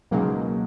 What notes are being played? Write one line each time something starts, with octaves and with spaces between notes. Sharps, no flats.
C#2 B2 F#3 G#3 A#3 D#4